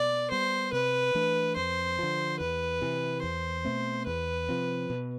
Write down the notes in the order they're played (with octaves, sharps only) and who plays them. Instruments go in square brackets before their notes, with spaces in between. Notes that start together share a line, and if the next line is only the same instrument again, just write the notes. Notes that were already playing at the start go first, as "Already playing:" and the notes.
Already playing: [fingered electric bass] B2 [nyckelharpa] D5
[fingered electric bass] G3 B3 [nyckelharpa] C5
[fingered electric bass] C3 [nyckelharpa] B4
[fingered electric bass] E3 A3 D4
[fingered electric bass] F2 [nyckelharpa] C5
[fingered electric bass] D3 F3
[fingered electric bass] E2 [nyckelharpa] B4
[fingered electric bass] C3 E3
[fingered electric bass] E2 [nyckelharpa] C5
[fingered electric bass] B2 A3 C4
[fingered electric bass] E2 [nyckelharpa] B4
[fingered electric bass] C3 F3 C4
B2